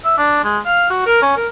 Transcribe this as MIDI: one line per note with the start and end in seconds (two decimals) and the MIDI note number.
0.05 0.18 76
0.18 0.43 62
0.44 0.58 56
0.66 0.89 77
0.90 1.03 66
1.06 1.19 70
1.22 1.35 61
1.37 1.47 70